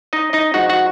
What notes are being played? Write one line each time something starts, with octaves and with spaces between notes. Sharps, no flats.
D#4 D#5
D#4 D#5
F3 G#3 D#4 F#4 F#5
F#4 F#5